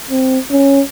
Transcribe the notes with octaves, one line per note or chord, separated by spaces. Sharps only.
C4
C#4